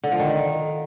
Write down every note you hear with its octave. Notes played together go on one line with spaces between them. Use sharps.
D3
F3
D#3